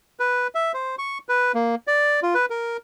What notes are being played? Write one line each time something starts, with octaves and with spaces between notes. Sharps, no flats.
B4
E5
C5
C#6
B4
A#3
D5
F4
B4
A#4